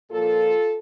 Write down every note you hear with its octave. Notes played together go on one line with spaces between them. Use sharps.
A#2 F3 A#3 F4 A4